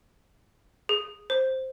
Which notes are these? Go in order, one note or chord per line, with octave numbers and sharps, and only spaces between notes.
G#4
C5